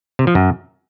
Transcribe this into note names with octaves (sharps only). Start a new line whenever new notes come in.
C3
F3
F#2